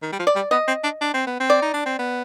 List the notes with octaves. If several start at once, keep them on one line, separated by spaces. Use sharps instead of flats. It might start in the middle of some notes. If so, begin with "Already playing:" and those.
D#3
G3
F3
D5
G3
B3 D#5
C4
D4
D4
C4
B3
C4
D5
D#4
D4
C4
B3